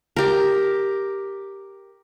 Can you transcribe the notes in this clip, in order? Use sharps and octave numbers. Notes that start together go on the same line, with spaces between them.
G4 A#4